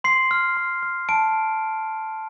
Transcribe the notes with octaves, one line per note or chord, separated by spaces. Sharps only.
C6 C7
F6
C6
F6
A5 D7